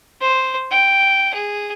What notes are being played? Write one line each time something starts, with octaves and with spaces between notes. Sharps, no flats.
C5
G5
G#4